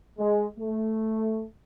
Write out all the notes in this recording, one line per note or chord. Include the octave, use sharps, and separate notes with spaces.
G#3
A3